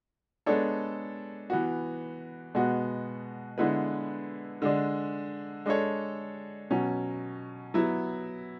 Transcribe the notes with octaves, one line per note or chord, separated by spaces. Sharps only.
G#3 B3 D4 A4 C#5
E3 B3 F#4
B2 G#3 B3 F#4
D3 G#3 B3 E4 B4
D3 G#3 D4
G#3 D4 A4 C#5
B2 F#3 C#4
F#3 B3 E4